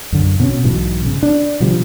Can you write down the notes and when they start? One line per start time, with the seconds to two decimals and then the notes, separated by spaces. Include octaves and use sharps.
0.12 F#2 D3
0.40 B2 C4 C#4
0.64 B1 G#2 B2 E3
1.05 C#3
1.23 D4
1.60 B2 D3 F3 G3